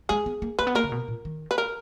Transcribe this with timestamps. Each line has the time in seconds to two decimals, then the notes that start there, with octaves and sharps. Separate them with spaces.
0.09 G#3 G#4
0.26 B3
0.42 A#3
0.59 A#3 B4
0.67 B3
0.75 A#3 A#4
0.84 C#3
0.92 B2
1.08 A#2
1.25 D#3
1.51 B4
1.58 A#4